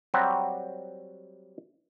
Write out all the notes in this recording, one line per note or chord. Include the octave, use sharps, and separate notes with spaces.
F#3 G3 C4 F#4 G4